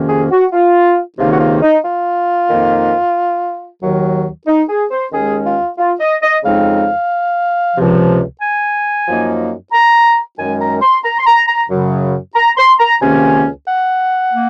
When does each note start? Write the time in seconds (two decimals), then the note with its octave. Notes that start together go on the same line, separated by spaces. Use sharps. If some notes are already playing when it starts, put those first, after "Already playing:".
Already playing: F2 C3 D#3 A#3 C#4
0.08 G#4
0.31 F#4
0.52 F4
1.18 C#2 C3 D#3 A#3 D#4 F4
1.31 F#4
1.40 F4
1.62 D#4
1.84 F4
2.50 F2 D#3 A#3 D#4
3.81 D#2 D#3 F#3
4.47 D#4
4.69 G#4
4.91 C5
5.12 D#2 D#3 G#3 C#4 G#4
5.45 F4
5.78 F4
6.00 D#5
6.22 D#5
6.44 F2 C#3 G#3 C4 D#4 F5
7.75 C#2 C3 F3
8.41 G#5
9.06 F#2 F3 A#3 D#4
9.72 A#5
10.38 F#2 D#3 G#3 C#4 G#5
10.60 A#5
10.82 C6
11.04 A#5
11.19 C6
11.26 A#5
11.48 A#5
11.69 F#2 C#3 F#3
12.35 A#5
12.57 C6
12.79 A#5
13.01 C#2 C3 D#3 A#3 C#4 G#5
13.67 F#5
14.32 A#3